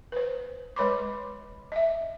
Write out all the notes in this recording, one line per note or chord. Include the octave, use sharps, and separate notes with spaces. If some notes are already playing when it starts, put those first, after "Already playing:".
B4 C5
G#3 B4 C#5 B5 C6 D6
D#5 E5